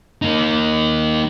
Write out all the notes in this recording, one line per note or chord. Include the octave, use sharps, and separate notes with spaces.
A#3 D#4